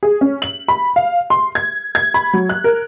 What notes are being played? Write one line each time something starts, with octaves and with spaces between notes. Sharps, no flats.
G#4
C#4
F#7
B5
F5
C6
G#6
G#6
B5
F#3
F#6
A#4